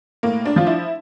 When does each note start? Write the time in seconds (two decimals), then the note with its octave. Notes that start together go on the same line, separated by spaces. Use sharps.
0.23 A2 A#3
0.46 D4
0.56 F3 F4
0.67 E4